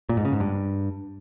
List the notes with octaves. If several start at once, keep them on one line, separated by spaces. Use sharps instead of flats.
A#2
G#2
C#3
G#2
G2